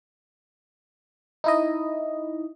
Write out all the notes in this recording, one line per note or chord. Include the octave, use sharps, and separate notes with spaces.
D#4 E4 D#5